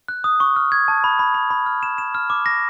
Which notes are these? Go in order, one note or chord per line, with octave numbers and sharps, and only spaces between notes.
F#6
D#6
C#6
F6
G#6
A5
B5
B5
B5
B5
F6
E7
E7
F6
D6
A#6